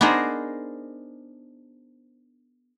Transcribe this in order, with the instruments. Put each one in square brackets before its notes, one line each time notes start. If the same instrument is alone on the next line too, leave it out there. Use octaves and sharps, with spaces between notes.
[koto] B3 D4 D#4 G#4 A#4 C5